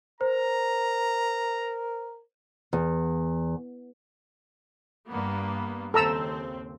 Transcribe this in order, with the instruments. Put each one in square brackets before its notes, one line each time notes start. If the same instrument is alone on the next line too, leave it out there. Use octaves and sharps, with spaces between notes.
[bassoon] A#4 [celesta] C5 [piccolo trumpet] A#5
[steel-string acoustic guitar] E2
[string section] G2 A#3 B3
[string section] D#2 C#3 C4 [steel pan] A4 A#5 E6